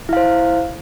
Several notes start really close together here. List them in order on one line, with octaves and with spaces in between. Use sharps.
E4 F5 C5